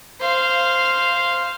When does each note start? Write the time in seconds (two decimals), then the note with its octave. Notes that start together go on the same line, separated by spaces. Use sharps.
0.20 C5 F5